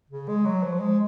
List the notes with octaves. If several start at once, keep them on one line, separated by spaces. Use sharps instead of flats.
C#3
G#3
F#3
F3
G#3